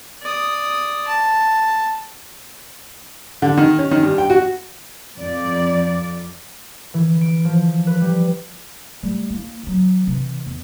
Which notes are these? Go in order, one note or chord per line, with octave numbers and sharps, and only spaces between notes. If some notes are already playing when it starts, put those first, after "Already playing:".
D5 D#6
A5
D3
D#3
C#4
D#3
G2
G5
F#4
F2 D5
E3
D7
F3
B4
G3
G3 A3
A#3 E4
D#3 F#3
C3 E3
E2